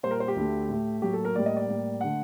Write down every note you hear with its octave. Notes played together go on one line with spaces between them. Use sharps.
A#2 G3 A#3 C5
A#4
C5
G4
D2 D3 A3
A2 A3
A2 F#3 A#3 G4
A4
A#4
A2 G3 A#3 D5
D#5
D5
A2 G3 A#3
D3 A3 F#5